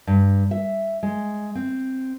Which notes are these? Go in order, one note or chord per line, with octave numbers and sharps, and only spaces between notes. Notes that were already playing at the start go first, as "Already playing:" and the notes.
G2
E5
G#3
C4